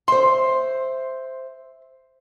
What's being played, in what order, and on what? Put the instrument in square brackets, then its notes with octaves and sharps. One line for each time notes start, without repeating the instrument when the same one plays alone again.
[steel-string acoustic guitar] C5 E5 [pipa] C6